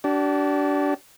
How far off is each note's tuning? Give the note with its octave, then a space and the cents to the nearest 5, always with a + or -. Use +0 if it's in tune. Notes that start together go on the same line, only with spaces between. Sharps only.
D4 -20 G4 -45